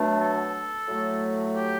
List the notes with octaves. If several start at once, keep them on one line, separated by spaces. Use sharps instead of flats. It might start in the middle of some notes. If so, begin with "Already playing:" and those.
Already playing: B2 F#3 A3 D4
A4
A2 F#3 A3
G4